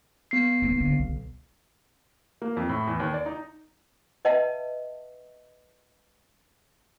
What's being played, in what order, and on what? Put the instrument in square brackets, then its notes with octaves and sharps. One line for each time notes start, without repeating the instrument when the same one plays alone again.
[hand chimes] B3 C7
[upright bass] A#3 D#4
D3
B1
[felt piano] A#3
F2
A2
E2
D#2
D5
D#4
[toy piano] B4 D#5 E5 F#5 A5